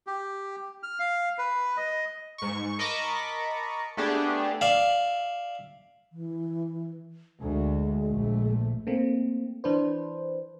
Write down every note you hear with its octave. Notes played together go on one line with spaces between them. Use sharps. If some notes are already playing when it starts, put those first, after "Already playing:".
G4
F6
F5
B4
D#5
G#2 C#6
A#4 D#5 A5 B5 C#6 D6
A3 B3 D4 G4 G#4
D5 E5 F5
E3
D2 G#3
A#1 A3
A3 A#3 C4
E3 D4 B4 C5